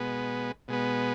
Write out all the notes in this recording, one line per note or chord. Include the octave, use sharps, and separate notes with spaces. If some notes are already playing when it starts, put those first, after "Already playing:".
Already playing: B2 G#3 B3
B2 G#3 B3